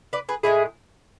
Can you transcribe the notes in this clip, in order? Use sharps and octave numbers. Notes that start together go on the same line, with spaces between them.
B4 D5
G#4 B4
A2 G#3 E4 G#4